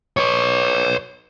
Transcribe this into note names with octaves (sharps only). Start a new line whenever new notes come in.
B4 C#5